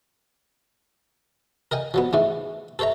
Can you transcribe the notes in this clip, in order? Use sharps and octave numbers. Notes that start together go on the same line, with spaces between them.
A#4 D#5 G5 G#5
F3 F#3 B3
G#2 E3 A3
A4 C5 C#5 E5 A#5